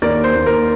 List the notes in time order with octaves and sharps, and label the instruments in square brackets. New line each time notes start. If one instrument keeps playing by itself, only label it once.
[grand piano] D#2 [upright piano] A#4 D5
[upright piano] C5
[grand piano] D#2
[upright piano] A#4